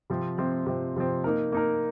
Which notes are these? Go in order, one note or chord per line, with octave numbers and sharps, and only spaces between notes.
C3 F3 C4
C3 F3 C4
C3 F3 C4
C3 F3 C4
A#3 D#4 A#4
A#3 D#4 A#4